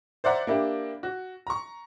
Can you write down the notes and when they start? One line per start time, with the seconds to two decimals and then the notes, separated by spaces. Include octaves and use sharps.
0.24 C5 D5 E5 F#5 A#5
0.47 A#3 D4 E4 G4
1.03 F#4
1.47 A#5 C#6